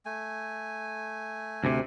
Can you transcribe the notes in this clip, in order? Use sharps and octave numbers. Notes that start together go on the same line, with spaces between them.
A3 G#5
D2 C3